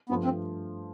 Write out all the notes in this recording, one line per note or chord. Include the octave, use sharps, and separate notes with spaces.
G2 F3 A3 B3
C4